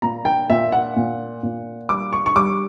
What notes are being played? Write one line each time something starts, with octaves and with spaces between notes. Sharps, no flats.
A#2 A#5
G5
A#2 E5
F#5
A#2
A#2
G3 D6
C#6
C#6
G3 D6